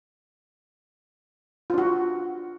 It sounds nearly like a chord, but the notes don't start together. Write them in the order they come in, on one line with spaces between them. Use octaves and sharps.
F4 D4 F#4